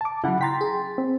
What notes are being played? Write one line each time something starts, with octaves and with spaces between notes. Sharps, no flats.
A5 D6
C#3 F#3 E4 F#5 B5
G5 A#5 C6 A6 B6
G#4
C4